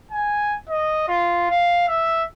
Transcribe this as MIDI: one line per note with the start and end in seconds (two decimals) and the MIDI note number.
0.11 0.57 80
0.69 1.05 75
1.08 1.47 65
1.50 1.84 77
1.88 2.23 76